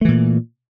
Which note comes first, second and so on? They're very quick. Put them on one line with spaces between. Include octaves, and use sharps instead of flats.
A3 E3 A#2